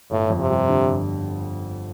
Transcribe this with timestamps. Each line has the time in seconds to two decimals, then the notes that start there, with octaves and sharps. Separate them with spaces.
0.11 G1 A2
0.30 F2
0.40 C3
0.50 G3
0.69 D3
0.89 G1